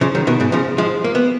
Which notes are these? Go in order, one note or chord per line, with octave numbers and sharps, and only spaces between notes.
C#3 F3
D#3 F#3
B2 D#3
G#2 B2
C#3 F3
F3 G#3
A#3
B3